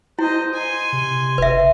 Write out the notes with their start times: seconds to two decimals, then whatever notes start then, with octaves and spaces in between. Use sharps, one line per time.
0.19 E4 C5 D#5
0.54 G#5 C6
0.92 C3
1.38 F#1 B4 E5